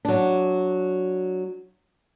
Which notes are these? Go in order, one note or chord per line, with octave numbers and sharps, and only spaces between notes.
F#3 D4